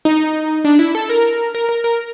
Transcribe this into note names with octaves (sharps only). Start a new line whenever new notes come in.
D#4
D4
E4
A4
A#4
A#4
A#4
A#4